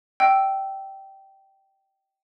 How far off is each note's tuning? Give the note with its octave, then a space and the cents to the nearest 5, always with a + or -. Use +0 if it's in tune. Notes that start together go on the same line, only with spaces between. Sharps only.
D#5 +0 G5 -15 E6 +0